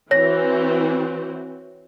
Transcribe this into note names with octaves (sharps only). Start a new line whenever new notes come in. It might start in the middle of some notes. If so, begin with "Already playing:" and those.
E3 C4 F#4 C#5 A#6